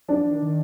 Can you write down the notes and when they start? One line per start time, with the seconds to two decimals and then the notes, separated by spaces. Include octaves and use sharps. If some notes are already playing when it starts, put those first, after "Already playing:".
0.09 F#3 D4
0.19 F3
0.31 D#3
0.42 D#3